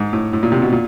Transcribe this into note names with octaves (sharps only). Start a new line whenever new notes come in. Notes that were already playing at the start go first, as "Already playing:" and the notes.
Already playing: G#2
A2
A2
A#2
C3
B2
A#2